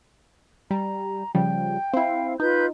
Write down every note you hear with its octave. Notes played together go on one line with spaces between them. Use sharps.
G3 A#5
C#3 F3 G3 G5
C4 E4 F5
D#4 F4 B4 G6